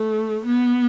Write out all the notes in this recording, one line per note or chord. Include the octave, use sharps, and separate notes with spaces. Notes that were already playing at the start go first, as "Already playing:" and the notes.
Already playing: A3
B3